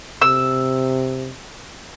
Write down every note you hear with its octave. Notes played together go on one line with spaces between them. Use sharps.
C3 E6